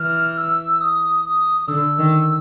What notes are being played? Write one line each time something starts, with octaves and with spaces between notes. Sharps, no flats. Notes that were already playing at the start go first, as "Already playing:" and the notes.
Already playing: E3 F6
E6
D#6
D#6
D#6
D3 E6
D#3